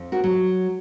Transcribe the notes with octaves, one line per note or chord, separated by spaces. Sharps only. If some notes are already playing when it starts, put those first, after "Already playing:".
Already playing: F2
F#4 A#4
F#3